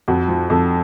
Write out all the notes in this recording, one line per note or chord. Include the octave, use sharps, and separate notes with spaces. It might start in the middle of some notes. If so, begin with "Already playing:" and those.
F2 F#4
F3
F2 A4